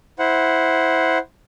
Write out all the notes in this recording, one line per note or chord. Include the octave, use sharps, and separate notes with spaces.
E4 C5 F#5